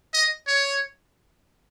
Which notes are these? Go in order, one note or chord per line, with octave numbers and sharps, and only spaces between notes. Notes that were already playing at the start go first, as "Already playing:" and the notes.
D#5
C#5